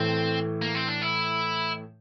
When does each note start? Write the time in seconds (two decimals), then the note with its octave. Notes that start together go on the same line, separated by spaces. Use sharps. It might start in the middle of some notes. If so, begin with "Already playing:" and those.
Already playing: A2 E3 A3 C4
0.62 A#3
0.75 C4
0.88 D4
1.02 E4